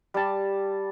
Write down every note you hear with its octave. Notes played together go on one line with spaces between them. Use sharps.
G3 A5